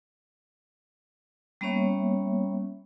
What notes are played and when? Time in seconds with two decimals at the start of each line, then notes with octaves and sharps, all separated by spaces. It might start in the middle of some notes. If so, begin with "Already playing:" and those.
1.61 G3 A#3 B3 C#4 C#5 E5